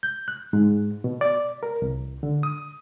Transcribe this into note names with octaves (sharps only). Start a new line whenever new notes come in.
G6
F#6
G#2
B2
D5
A#4
C2
D3
D#6